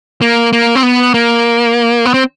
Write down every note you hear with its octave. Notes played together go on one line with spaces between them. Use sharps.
A#3
A#3
C4
B3
A#3
B3
C4